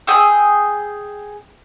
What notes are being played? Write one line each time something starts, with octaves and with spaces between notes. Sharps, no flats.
G#4 G5 E6